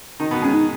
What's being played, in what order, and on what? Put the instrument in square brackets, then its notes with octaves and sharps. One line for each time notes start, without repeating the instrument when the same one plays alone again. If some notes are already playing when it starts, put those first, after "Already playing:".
[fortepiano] D#3 D#4
B2 B3
[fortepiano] G#3 [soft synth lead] C#4
[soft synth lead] D#4